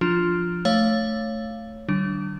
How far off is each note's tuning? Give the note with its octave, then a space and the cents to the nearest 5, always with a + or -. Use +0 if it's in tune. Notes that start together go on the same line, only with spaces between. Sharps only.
F3 +0 D4 +0 F4 +0
A3 +0 C#5 +0 F5 -10
D3 +45 G3 -40 D4 +0